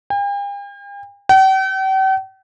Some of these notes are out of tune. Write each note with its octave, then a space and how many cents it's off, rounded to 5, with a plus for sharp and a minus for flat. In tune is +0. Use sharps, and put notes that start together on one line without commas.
G5 +45
G5 -45